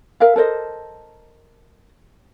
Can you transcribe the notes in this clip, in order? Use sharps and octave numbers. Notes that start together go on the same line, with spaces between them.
A#4 E5 F5
A4 A#4 C5 D#5